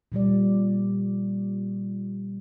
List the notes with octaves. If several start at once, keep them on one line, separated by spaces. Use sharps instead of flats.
A#2 F3 G3 D5